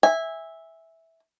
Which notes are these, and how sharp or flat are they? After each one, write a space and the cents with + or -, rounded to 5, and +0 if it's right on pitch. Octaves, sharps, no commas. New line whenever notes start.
E5 -10 G#5 -25